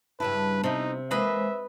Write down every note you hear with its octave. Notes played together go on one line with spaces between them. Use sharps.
G2 C#3 E4 B4 A5
C3 B3 D#4 E4
E3 G#3 A#3 B4 C5 D#5 E5 B5